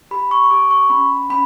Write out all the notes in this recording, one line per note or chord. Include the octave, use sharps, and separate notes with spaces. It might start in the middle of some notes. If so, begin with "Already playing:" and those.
G4 B5
C#6
C#6
G4 D6
C#6
C#4 B5
C#4 B5